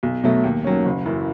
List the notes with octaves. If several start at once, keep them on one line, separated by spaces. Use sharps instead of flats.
B1
B2 F#3 A3
D#2
D#3 F#3 C#4
F#1
F#2 E3